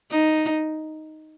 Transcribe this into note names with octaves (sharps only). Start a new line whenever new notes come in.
D#4